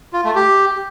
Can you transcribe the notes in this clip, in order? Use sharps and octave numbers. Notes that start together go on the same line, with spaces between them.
F4
A3
G4